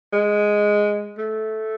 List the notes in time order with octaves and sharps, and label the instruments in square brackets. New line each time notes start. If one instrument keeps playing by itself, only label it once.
[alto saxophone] G#3
A3